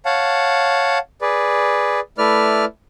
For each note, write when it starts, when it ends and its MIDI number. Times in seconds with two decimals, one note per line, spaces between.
0.05 0.98 73
0.05 0.98 77
0.05 0.98 78
0.05 0.98 81
1.21 2.00 68
1.21 2.00 71
1.21 2.00 74
2.18 2.65 57
2.18 2.65 64
2.18 2.65 71
2.18 2.65 74
2.18 2.65 89